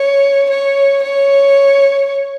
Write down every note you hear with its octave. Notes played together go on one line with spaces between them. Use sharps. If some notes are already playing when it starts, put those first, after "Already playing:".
Already playing: C#5
C#5
C#5